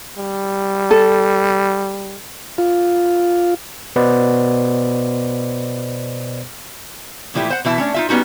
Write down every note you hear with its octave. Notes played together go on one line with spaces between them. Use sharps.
G3
A4
F4
B2 B3 B4 C5 D5 D#5
A#2 E3 F3 A3 E4 G4
C5 F#5
B2 E3 E4 A5
A3 C#4 D4
D#4 F4 E5
G3 B3 C#4 D#4 F#4